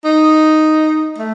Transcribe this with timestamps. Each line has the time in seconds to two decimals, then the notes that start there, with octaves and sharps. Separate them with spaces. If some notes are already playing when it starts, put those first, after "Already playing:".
0.04 D#4
1.18 A3